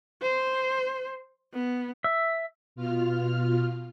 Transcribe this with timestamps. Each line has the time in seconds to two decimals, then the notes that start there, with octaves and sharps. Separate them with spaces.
0.22 C5
1.54 B3
2.04 E5
2.76 B2 F4 F6